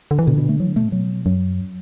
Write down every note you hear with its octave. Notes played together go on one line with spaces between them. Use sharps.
D3
E3
B2 D3
B2
A3
E3 F#3
D3
B2 A3
A2
B2 F#3
F#2 F#3